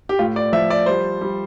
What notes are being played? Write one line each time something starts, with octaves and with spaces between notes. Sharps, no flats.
G4
A2 F4
D5
F3 E5
D5
G3 C5
G3